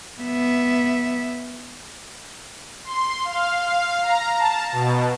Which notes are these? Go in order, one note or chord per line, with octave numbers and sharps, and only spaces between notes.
B3 E5
C6
F5
F5
A#5
A5
B2